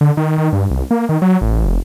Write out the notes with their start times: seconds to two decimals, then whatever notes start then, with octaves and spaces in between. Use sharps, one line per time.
0.01 D3
0.17 D#3
0.38 D#3
0.53 G2
0.70 C2
0.91 A#3
1.09 D#3
1.22 F#3
1.41 A1
1.65 F1